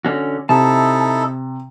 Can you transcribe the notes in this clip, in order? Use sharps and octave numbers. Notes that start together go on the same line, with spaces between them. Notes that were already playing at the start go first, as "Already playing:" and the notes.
D3 C#4 F#4
C3 D#4 E4 A4 A5